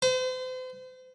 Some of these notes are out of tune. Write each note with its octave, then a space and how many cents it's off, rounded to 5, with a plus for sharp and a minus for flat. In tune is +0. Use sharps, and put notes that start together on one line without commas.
C5 -40